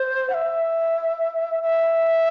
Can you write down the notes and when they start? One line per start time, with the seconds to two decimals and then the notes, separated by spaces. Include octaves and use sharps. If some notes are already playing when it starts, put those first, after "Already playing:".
Already playing: C5
0.30 F#5
0.34 E5
1.63 E5